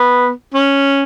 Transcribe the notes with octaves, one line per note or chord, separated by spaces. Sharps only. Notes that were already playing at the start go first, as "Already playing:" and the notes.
Already playing: B3
C#4